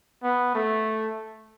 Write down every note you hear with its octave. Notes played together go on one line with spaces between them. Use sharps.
B3
A3